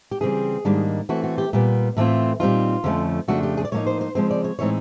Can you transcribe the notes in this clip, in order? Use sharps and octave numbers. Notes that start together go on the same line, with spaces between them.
G4
C#3 E3 G3 C4 G#4
G#2 D#3 G3 A#3 D4
E3 A3 C4 F#4
F#4
G4
A#2 G3 B3
A2 E3 A3 C4 F4
A#2 G3 C4 D#4 F4
F2 D3 F3 A3 C#4
F2 C#3 F3 A3 D4 F#4
G4
G#4
D5
A2 F3 A#3 D#4 C#5
C5
C5
C#3 F3 G#3 C4 C5
D5
C#5
A2 E3 G#3 C4 D#4 C#5